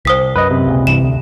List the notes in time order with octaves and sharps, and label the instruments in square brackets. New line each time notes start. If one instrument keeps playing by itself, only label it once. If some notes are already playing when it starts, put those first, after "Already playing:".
[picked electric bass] C2 [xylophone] C5 D#6 B6
[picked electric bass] F#2 [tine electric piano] B4 D#5
[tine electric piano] C3
[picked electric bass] C#2 A#2
[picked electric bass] C2 G2 E3 [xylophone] E7
[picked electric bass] D2